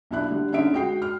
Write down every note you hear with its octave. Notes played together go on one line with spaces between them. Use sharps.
B1 D4 E4 F#6
D3 G3
D3 C#4 D#4 E5 D7
G#3 F#4 G5 C7
F6